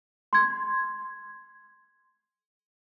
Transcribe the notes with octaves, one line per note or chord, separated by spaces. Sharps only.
C6 G#6